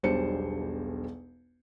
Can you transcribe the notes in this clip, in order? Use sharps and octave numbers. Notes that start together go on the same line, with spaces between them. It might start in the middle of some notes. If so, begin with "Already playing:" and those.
E1 B1 G3 D4 C5 C#7